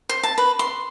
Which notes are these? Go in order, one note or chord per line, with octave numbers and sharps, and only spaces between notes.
C5
A5
B4
C6